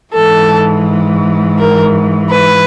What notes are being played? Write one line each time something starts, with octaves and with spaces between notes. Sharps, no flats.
G#2 E3 A4
A#4
B4